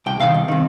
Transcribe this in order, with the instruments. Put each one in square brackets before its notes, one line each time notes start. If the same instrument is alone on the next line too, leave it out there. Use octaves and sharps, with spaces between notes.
[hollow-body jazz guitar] C2 G5
C3 D#3 F5
C2
C3 D#3